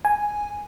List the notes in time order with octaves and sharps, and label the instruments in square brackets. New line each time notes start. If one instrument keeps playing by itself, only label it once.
[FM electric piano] G#5